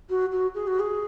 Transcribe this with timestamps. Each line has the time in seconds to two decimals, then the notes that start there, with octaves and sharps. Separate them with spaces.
0.10 F#4
0.31 F#4
0.55 G#4
0.67 F#4
0.79 G#4